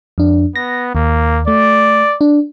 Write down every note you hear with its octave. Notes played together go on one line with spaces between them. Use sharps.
F2 D4
B3 A#6
D#2 A#3
A3 D5
D4